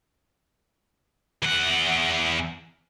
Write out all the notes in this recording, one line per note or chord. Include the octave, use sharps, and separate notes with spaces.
E2 F#5